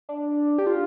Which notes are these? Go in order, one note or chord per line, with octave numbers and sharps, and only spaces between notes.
D4
G4
F4